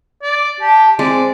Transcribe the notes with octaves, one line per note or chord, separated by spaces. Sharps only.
D5
G4 A5
G#3 C4 D5